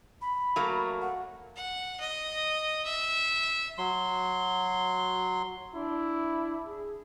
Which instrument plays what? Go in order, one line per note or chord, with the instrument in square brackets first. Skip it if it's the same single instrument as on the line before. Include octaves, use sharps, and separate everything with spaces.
[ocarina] B5
[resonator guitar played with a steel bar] F#3 A3 A#3
[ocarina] F#5
[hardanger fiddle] F#5
D#5
E5
[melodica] F#3 C6
[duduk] D4 [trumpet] E4
[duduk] G#4